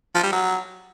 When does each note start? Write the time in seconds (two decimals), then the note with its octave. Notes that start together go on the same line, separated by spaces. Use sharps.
0.15 F3
0.24 G3
0.32 F#3